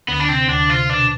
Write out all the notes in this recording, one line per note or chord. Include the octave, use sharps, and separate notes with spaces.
D2 D3 B3
D4
C3 C4
D2 D3 D4
C3 F4
B2 D4